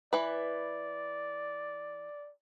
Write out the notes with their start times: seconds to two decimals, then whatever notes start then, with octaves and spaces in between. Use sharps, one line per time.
0.13 E3 B4 D5